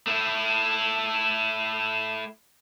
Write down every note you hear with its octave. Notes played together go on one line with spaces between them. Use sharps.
A3 E4